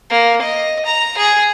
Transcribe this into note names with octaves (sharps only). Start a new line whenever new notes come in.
A#3
D#5
A#5
G#4